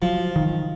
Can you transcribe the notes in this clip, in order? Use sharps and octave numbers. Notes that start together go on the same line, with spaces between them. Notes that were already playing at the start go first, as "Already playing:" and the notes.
F3 F#3
D#3